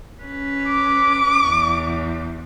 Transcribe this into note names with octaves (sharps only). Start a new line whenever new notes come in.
C#4 B4
D6
E2